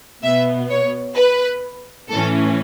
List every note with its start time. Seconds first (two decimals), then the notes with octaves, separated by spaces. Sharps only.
0.23 B2 B3 E5
0.69 C#5
1.16 B4
2.09 A2 E3 C#4 A4